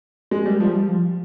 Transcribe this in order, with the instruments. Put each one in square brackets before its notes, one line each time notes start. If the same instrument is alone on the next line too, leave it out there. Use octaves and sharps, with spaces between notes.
[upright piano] G#3
G3
[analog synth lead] G#3
[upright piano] F3 [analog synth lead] G3
[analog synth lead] G3
F3